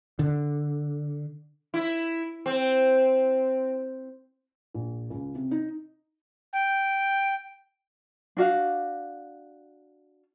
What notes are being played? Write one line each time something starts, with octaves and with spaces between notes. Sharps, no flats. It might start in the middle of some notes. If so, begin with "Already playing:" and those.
D3
E4
C4
A#1
C#2
C3
D#4
G5
D4 F#4 F5